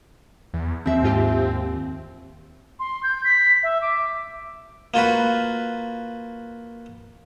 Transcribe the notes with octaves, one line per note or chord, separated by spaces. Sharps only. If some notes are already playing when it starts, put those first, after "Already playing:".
E2
D#2 C4 E5
G#2 F4 G4
C6
G6
B6
E5
D6
A#3 F4 F#4 B4